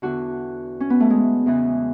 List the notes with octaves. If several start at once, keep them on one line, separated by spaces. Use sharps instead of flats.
E2 D3 F#4
C#4
B3
A3
G#3
E2 C#3 E3